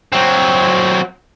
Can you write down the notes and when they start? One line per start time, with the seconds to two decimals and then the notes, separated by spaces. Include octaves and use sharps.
0.13 F#3 C4